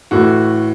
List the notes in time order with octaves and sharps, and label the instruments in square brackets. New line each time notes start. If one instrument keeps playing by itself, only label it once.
[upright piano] A2 E3 A3 F#4